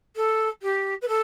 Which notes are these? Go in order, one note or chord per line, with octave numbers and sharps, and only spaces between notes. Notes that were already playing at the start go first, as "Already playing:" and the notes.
A4
G4
B4
A4